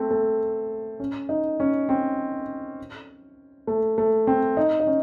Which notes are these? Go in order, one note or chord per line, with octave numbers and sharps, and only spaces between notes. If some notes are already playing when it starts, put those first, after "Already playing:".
Already playing: A3 C4
A3
C#4
D#4
C#4
C4
A3
A3
C4
D#4
D#4
C#4